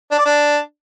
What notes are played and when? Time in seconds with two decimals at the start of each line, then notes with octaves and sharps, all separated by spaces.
0.11 D4
0.18 D5
0.26 D4